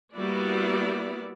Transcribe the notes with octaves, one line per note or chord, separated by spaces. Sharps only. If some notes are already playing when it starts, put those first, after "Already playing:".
G3 A#3 B3 E4 F#4 D5